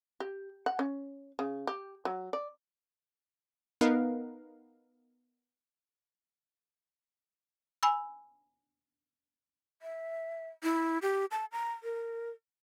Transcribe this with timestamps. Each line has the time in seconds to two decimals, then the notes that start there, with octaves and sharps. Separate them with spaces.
0.20 G4
0.66 F#5
0.79 C#4
1.39 C#3
1.67 G4
2.05 F#3
2.33 D5
3.81 B3 D#4 A#4 B4 F5
7.83 G#5 B5 E6
9.82 E5
10.63 E4
11.02 G4
11.31 A5
11.52 A#5
11.83 A#4